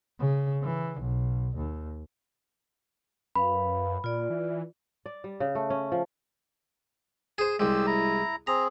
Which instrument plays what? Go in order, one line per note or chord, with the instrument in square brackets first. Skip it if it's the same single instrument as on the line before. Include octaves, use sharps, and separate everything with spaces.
[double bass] C#3
E3
B1
D#2
[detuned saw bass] F#2 [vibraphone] B4 F5 [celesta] B5
[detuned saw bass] A#2 [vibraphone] F4 D5
[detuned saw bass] E3
[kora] D5
G3
C#3
A3
C#4
F3
[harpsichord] G#4 C5
[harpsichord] C2 G#3 [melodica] G4 C5 E6
[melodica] E4 A#5
[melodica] C4 G#4 [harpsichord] A#5